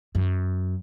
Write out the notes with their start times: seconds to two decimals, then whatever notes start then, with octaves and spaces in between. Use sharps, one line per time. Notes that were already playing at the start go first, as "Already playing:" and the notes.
0.15 F#2